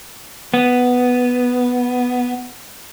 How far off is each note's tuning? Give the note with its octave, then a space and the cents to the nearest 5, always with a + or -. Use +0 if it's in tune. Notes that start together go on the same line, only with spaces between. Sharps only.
B3 +0